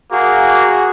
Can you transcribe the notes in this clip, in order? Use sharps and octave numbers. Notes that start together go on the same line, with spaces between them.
A#3 F#4 G#4